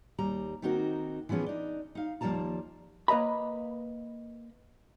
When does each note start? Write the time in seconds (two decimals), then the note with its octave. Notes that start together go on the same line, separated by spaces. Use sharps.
0.18 D#2 G3 A#5
0.62 D#3 A#3 C4 D#4 F#4 A#4
1.29 E3 F3 B3 C#4 G#4
1.46 D4 D#4
1.95 D#4 F5
2.21 D#2 F3 G3 A#3 A5 A#5
3.08 A#3 B4 D#5 A#5 B5